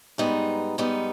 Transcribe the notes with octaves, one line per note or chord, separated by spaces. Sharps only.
G#2 G3 B3 D#4
G#2 G3 B3 D#4